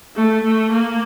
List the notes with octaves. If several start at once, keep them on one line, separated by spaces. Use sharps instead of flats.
A3
A3
A#3